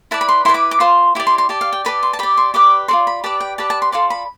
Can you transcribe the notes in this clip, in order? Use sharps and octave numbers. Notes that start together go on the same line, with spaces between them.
E4 B4 D5 A5
B5
C6
E4 B4 D5 C6
D6
D6
F4 C5 C6
E4 G4 D5 D6
C6
C6
G4 D5 A5
F5
G5
G4 B4 D5 A5
C6
A5
G4 D5 B5
C6
G4 B4 D5 D6
F4 A4 D5 C6
B5
G4 B4 D5 A5
G5
G4 B4 D5 A5
A5
C6
F4 A4 D5 C6
B5